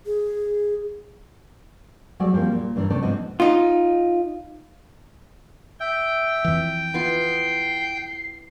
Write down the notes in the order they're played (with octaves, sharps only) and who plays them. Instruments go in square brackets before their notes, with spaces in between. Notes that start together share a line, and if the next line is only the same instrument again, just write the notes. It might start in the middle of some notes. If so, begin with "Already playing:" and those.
[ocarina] G#4
[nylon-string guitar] F#3 G3 A3 F#4 G#4 D5
F3 G3 A#3 C4
A#2
G2 E3 A3 D4 A#4
C3 A3 C#4 D4 D5
G#2 F3 B3 C4 D4 D#5
[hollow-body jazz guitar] D#4 F4
[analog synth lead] E5 [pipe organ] G5
[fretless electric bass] F2 E3
[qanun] B3 E4 F4 [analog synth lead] C7